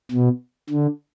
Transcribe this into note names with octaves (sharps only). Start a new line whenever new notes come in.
B2
D3